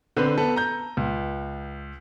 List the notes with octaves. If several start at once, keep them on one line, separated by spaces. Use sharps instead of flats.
D3 C4 B4
B3 A4 B4
A#5 G6
C#2